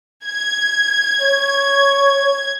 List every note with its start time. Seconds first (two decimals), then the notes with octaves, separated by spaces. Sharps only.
0.25 G#6
1.21 C#5